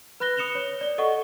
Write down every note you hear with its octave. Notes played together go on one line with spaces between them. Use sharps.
B4 B5 F#6 A#6 G7
D#6 C#7 E7 F7 G7
C#5
D5 G7
A4 D#5 F#5 C#6